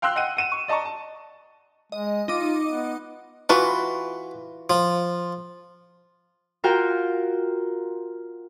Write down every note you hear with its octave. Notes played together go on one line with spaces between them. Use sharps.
F5 G5 C6 E6 F#6
D#5 F#5 G5 D#7
F#5 D#7 E7
C#6
D5 D#5 A5 A#5 C#6
A5
G#3 D#5
D#4 F4 D#5 D6
B3
E3 F4 F#4 B4
F3
F4 F#4 A#4 G5